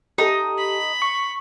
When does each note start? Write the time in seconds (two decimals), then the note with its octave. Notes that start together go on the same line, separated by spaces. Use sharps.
0.18 D#4 G4 A4
0.58 B5
1.02 C#6